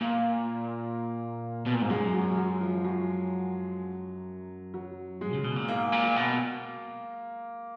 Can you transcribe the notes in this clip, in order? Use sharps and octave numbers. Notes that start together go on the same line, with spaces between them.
A#2 A#3
B2
A#2
G#2
F#2 G#3
F#3
F#3
F3
F3
F#3
F#3
G#3
C#3
B2
A#2
G#2 A#3
A#2
B2